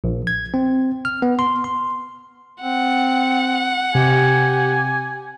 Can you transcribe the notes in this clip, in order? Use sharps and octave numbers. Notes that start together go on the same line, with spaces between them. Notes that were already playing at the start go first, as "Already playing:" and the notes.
A#1
G#6
C4
F6
B3
C6
C6
C4 F#5
C3 G4 G#5